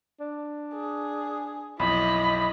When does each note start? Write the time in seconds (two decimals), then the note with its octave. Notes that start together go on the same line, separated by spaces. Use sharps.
0.20 D4
0.74 G#4
1.79 B1 F2 E4 D#5 B5